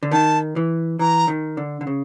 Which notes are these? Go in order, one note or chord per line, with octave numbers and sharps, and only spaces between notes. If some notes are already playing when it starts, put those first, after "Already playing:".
D3
D#3 A5
E3
E3 A#5
D#3
D3
D3
C#3